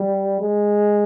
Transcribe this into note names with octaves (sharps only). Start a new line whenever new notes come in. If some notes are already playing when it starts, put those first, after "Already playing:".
Already playing: G3
G#3